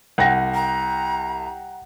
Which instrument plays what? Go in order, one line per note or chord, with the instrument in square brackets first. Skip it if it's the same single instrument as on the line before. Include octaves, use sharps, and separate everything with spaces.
[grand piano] C2 [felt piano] F#5 G5 A#6
[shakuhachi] A#5